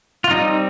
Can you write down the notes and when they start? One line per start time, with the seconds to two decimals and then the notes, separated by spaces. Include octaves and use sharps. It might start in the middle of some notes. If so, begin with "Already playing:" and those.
0.24 F4
0.31 G3 C4 D#4